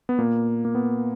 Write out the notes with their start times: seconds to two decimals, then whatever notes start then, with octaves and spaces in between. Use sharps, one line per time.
0.09 B3
0.18 A#2 A#3
0.65 A#3
0.75 B3